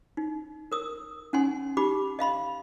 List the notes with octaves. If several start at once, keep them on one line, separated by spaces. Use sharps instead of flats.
D#4
A#4 D#6 E6
C#4 D#4 F#5 G#5 C6
D#4 F#4 G4 B5 D6
D#5 F5 B5 C6